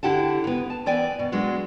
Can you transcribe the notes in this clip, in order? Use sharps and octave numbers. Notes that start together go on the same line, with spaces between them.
D3 E4 G4 F#5 A5
C#3 B3
A5
E3 B3 D5 G5 G#5
B2
F#3 G#3 B3 D4